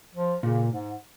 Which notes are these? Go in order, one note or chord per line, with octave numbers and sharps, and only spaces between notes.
F3
A#2 C#3
G#2